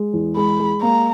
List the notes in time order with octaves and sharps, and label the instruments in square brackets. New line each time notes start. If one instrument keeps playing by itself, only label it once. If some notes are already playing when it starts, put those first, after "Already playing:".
Already playing: [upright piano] G#3
E2
[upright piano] G#3 [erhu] B5
[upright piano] G#3
[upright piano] A#3 [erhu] A#5